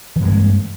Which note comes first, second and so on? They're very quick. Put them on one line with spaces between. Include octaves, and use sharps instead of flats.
E3 G2 G#3 A#3